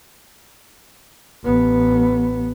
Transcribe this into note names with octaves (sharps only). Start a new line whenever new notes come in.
A1 B3